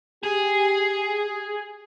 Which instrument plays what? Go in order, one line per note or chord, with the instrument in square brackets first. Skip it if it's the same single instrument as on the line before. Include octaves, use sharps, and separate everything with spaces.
[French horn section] G4 [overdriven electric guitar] G#4